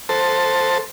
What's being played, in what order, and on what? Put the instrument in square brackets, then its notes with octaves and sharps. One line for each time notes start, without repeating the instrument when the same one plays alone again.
[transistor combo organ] A4 C5